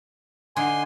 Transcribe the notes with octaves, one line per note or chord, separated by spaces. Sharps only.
D3 D#4 G#5 C6